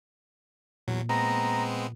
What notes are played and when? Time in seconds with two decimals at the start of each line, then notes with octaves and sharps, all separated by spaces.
0.88 E2 A#2 F#3
1.09 G#3 B3 C4 A#5